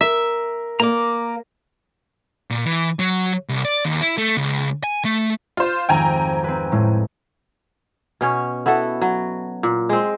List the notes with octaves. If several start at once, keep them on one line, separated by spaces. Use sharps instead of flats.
A#4 E5
A#3 D5 A#5 D6
A#2
E3
F#3
C2
D5
D#2
E4
A3
C#2
G#5
A3
F4 C5
G#1 F2 G5 G#5 A#5
C4 B4
A2 G#3
B2 C#4 C#5
B3 E4 F#4 A4
F#3
A#2
G#3 C4